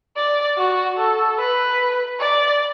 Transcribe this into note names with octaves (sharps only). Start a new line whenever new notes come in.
D5
F#4
A4
B4
D5